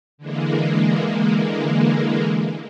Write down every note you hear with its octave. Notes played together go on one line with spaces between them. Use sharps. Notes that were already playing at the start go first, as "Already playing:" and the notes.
D3 E3 G#3 A#3